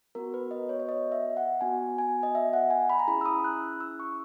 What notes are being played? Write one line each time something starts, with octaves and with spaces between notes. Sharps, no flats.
B3 F#4 A#4
B4
D#5
C#5
C#5
D#5
E5
F#5
B3 F#4 G#5
G#5
D#5
E5
F#5
G#5
B5
A#5
C#4 E4 G#4 B5
E6
D#6
F#6
E6
C#6